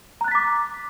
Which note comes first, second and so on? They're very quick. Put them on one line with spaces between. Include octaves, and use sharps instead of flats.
A#5 F#6 A6 B6 D6